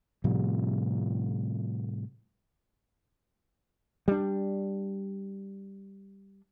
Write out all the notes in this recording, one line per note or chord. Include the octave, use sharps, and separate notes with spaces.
A2 C3 F3 G3
G3 D4